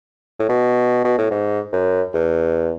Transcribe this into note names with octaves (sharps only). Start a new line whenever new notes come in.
A2
B2
B2
A2
G#2
F#2
E2